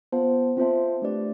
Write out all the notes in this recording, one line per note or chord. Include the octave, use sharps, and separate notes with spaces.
B3 F4 C5 F5 A5
C4 F4 C5 E5 A5
A3 D4 G4 B4 D5